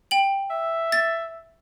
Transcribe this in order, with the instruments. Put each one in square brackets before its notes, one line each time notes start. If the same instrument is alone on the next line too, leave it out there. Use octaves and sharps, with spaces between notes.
[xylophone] G5 F#7
[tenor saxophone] E5
[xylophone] A6